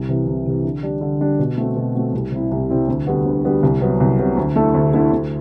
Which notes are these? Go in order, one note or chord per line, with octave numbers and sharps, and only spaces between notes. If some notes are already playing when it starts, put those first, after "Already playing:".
Already playing: C2
C3 E3
C2
C3 E3
D3
G3 D4
D3
G3 D4
B2
A3 C4 F#4
B2
A3 C4 F#4
C2
C3 G3 C4 E4
C2
C3 G3 C4 E4
D2
D3 G3 B3 F#4
D2
D3 G3 B3 F#4
C2
C3 F#3 B3
C2
C3 F#3 B3
D2
D3 A3 E4 A4
D2
D3 A3 E4 A4
D2